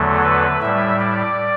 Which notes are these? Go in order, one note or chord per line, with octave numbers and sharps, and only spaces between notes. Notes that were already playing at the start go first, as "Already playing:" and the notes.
Already playing: E2 D3 F#3 A3
B4
A2 G3 E5
D5